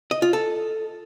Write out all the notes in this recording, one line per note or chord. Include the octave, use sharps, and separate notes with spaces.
D#5
F4
A4